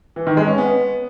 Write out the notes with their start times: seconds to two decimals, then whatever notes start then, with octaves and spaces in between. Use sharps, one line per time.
0.16 E3
0.27 D#3
0.37 G#3
0.47 C#4
0.58 B3